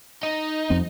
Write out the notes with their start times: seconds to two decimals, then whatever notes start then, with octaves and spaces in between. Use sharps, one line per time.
0.23 D#4
0.70 F2 C4